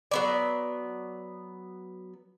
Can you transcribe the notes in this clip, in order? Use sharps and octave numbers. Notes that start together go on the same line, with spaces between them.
F#3 B3 D5